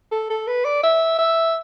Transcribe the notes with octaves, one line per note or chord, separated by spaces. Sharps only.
A4
A4
B4
D5
E5
E5